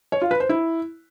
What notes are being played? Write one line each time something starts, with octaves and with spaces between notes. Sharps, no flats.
C#5
F4
B4
C5
E4